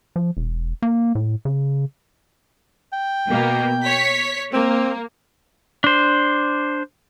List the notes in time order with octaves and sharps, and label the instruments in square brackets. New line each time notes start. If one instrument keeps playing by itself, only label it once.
[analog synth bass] F3
E1
A#3
A2
C#3
[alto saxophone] G5
[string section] B2 A#3
C#5 B6
[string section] A#3 [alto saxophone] C4
[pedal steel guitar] D4 C5